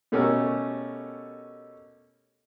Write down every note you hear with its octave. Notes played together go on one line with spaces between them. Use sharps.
B2 A3 C#4 G4 A4 A#4